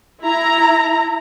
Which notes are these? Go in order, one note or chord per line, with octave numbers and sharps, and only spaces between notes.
E4 A#5